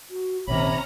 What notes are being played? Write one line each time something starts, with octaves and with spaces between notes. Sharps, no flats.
F#4
A#1 C3 D#3 C#4 C#5 A#5 B5